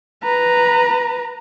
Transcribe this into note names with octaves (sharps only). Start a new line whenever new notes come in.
B4 A#5